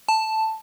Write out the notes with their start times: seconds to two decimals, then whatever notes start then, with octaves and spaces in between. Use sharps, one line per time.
0.09 A5